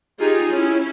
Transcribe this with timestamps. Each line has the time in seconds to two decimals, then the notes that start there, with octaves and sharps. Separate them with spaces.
0.19 D#4 F4 G4 G#4
0.51 C#4 E4